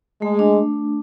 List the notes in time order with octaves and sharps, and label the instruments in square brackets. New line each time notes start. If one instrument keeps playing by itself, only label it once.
[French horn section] G#3 [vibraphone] A3
[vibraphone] D4